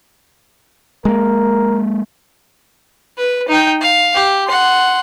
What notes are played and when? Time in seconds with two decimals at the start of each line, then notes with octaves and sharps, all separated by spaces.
1.05 G#3 A#3 A#4
3.18 B4
3.48 D#4 G5
3.81 F5
4.15 G4
4.47 F#5 C6